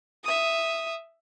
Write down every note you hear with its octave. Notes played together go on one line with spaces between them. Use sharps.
E5 D#6